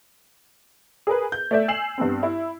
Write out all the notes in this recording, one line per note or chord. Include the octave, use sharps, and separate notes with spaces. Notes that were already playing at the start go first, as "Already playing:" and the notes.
G#4 A#4 B4
G6
A3 D5 E5
G#5 E6 C7 E7 F#7
G2 B3 C4
E4